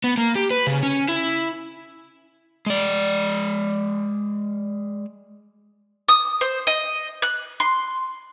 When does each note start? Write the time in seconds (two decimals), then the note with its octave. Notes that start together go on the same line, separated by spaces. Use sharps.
0.04 B3
0.18 A#3
0.35 G4
0.51 B4
0.67 C#3
0.83 C#4
1.08 E4
2.66 G#3 D5
6.09 D#6
6.41 C5
6.67 D#5
7.22 F#6
7.60 C6